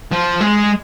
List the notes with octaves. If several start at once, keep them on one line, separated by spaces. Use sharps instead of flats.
F3
G#3